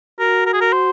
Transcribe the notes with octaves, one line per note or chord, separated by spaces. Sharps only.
F#4 A#4
A#4
G#4
A#4
C5